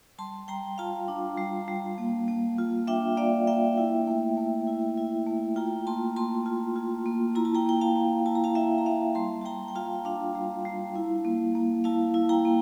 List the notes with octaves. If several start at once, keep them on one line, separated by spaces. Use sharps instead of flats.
G3 A5 C6
G3 G5 A#5
F4 F5 A5
D4
G3
G3
A#3
A#3
F4
D4 E5 G5
A#3 D5 F5
A#3 E5 G5
E4
A3
A3
E4
E4
A3
F4 G5 A#5
A#3 A5 C6
A#3 A5 C6
F4
F4
A#3
E4 A#5
A5
G5 A#5
A#3 G5
F5 A5
A#3
E4 A5
A#5
F5 A5
E4 E5 G5
A#5
A#3 F5 A5
G3 A5 C6
A5
G3 G5 A#5
G5
F4 F5 A5
D4 F5 A5
G3
G3
E4
A#3
A#3
E4 F5 A5
E4
G5 A#5
A#3